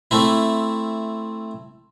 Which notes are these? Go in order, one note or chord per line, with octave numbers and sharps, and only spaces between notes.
A3 C4 E4